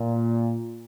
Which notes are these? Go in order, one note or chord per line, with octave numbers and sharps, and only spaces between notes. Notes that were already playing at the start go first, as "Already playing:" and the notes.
Already playing: A#2